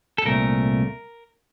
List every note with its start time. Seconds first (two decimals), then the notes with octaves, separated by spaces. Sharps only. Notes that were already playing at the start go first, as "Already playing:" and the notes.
0.18 A4
0.26 C2 A#2 A3 A#4